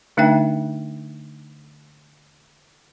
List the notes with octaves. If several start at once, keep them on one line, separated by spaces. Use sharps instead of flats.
D3 A3 D4 D#4 E5 G5